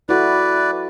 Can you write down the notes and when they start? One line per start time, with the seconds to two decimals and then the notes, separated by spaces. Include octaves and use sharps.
0.09 E4 F#4 A4 B4 D5